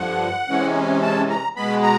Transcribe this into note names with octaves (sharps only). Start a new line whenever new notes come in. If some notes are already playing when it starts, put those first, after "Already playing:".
Already playing: G2 D3 F3 F#5
C3 E3 G#3 C#4
A5
A#5
B2 G#3 B3 B5
A#5